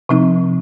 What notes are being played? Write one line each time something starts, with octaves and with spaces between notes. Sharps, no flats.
C3 F3 C4 D#4